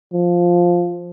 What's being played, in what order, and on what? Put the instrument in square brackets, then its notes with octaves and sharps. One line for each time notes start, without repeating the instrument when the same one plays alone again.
[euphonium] F3